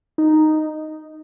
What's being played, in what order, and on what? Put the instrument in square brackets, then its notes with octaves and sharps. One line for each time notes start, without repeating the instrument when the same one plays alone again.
[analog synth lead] D#4